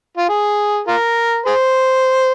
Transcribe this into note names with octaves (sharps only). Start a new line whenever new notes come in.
F4
G#4
F4 A#4
G#4 C5